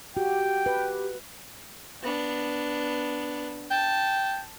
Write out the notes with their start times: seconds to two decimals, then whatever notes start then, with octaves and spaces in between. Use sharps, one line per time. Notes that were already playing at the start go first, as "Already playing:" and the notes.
0.17 F#4 G4 G5
0.66 B4
2.03 B3 D4
3.71 G5 A5